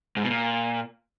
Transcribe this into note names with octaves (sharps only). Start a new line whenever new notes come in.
G#2
B2
A#2